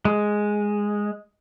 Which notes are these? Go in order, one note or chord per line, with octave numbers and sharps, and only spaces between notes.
G#3